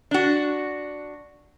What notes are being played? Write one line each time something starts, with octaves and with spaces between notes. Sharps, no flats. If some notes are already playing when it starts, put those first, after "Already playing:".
D4 F#4